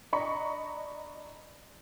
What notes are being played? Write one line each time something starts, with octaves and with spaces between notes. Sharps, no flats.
D4 D#5 A#5 B5 C#6